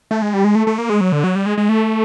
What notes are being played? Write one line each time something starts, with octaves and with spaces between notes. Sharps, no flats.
A3
G#3
G3
G#3
A3
A3
A#3
G#3
F#3
D3
F#3
G3
G#3
G#3
A3